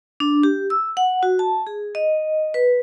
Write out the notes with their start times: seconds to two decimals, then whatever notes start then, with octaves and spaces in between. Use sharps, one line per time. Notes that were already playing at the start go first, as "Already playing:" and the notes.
0.20 D4
0.43 G4
0.70 E6
0.97 F#5
1.23 F#4
1.39 A5
1.67 G#4
1.95 D#5
2.54 B4